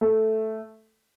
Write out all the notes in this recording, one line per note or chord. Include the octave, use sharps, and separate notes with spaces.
A3